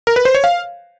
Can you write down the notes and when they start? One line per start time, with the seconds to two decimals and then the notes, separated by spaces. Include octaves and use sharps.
0.07 A#4
0.16 B4
0.25 C5
0.35 C#5
0.44 F5